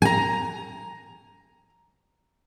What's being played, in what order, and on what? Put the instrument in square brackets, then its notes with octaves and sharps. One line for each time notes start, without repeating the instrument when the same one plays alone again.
[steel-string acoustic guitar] G#5 A#5